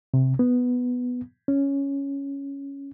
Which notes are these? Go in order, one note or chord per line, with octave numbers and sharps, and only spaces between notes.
C3
B3
C#4